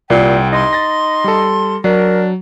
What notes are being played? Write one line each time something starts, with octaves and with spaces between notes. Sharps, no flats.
C2 A#2 G5
D#4 C6
A6 A#6
G3 A4
F#3 D4 A#4